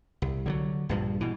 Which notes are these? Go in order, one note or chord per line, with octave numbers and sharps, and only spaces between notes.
C2
D3 F3 F#3
A#1 G2 F3
B2 E3